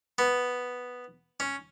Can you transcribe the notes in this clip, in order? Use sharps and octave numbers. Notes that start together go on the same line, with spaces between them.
B3
C#4